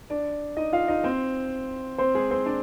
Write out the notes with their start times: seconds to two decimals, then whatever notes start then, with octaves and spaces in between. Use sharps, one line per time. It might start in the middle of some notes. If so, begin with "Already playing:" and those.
0.10 D4 D5
0.57 D#4 D#5
0.73 F4 F5
0.88 D#4 D#5
1.04 C4 C5
1.98 C4 C5
2.14 G#3 G#4
2.31 C4 C5
2.46 D4 D5